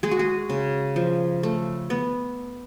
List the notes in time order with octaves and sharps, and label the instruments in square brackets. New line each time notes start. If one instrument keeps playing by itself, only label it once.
[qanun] G#3 G#4
F#4
G#4
C#3
F3
A3
B3